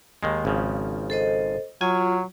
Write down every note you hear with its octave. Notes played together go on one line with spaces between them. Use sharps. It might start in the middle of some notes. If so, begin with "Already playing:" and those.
D#2 D#3 G#3
G#1 C#3 F3
A4 C5 D#5
F#3 F4 G#5